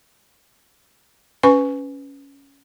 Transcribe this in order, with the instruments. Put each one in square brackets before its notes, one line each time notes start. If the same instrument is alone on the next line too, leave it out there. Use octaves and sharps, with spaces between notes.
[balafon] C#4 B4 G#5 C#6